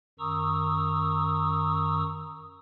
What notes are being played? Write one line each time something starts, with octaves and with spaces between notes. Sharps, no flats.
F#2 D#3 A#5 C#6 D#6 E6